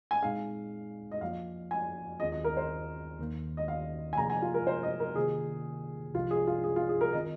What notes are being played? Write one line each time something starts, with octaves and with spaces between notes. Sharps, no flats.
G#5
A#2 G#3 C4 D#4 G#4 F5
D#5
F2 F3 A#3 F4 F5
G#5
D#2 D#3 C4 F4 G#4 D#5
D#5
A#4
C5
D#2 D#3 A#3
D#5
F5
G#5
C3 F3 A#3 G#4 A#5
G#5
F4
A#4
C5
D#5
A#4
C3 D#3 A#3 F4 G#4
C2 C3 F3 F4
G#4
F4
G#4
F4
G#4
A#4
D#3 C4 F4 D#5